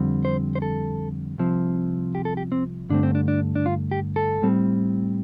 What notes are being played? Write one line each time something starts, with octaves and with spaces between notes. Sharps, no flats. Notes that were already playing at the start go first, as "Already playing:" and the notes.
Already playing: F2 D3 G3 C4
C5
C5
A4
C2 C3 F3 C4
G4
A4
G4
C4
G2 D3 A3 C4 D4
C4
D4
D4
D4
F4
G4
A4
A2 G3 C4